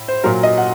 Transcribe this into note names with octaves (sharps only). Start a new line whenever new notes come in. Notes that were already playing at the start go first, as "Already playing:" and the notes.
Already playing: A2
C5
A#2 F#3 A#4
D#5
F#5